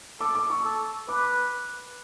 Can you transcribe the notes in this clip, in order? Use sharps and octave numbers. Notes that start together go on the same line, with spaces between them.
A4 D6
D6
C#6
A4
B4 D6